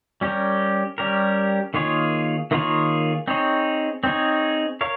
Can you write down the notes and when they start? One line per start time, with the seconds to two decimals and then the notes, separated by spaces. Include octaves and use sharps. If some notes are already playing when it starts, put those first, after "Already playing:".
0.21 G3 C#4 G4 A#4
0.98 G3 C#4 G4 A#4
1.74 D#3 A#3 F4 G#4 C#5
2.51 D#3 A#3 F4 G#4 C#5
3.28 C4 D#4 G#4 C#5
4.04 C4 D#4 G#4 C#5
4.81 A#4 C#5 F5